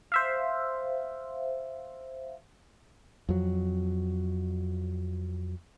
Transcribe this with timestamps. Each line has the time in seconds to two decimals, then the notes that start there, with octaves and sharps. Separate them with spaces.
0.12 C5 E5 F5
3.29 F2 F#3